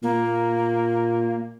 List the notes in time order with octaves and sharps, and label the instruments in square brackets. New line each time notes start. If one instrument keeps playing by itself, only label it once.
[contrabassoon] A#2 [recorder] A#3